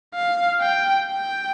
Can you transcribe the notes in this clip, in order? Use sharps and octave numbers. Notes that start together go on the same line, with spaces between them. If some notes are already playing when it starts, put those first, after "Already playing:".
F5
G5
G5